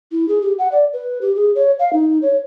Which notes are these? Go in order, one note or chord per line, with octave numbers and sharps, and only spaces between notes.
E4
G#4
G4
F#5
D5
B4
G4
G#4
C#5
F5
D#4
C#5